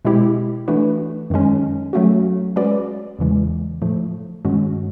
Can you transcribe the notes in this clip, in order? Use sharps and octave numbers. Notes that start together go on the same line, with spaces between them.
B2 G#3 C4 E4 G4
E3 A3 D4 F#4 B4
F#2 D#3 G#3 C#4
F#3 A3 C#4 F#4
G#3 C#4 F#4 B4 D5
E2 C#3 E3 G#3
A2 F3 A3
G2 D#3 G#3 C#4 F#4